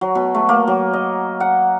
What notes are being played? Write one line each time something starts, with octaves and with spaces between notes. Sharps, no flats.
F#3
B2
A3
A#3
F#3
D#5
F#5